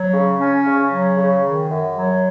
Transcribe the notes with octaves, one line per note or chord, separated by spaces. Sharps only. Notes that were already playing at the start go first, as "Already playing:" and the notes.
Already playing: F#3
C#3
C#4
C#3
F#3
C#3
D#3
F#2
F#3